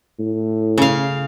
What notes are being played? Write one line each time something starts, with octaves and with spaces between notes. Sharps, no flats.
A2
C#3 F5